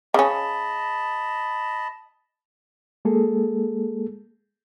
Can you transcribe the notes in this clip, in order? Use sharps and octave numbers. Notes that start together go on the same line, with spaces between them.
C#3 C#4 D#5 A5 B5
G#3 A#3 G#4 A4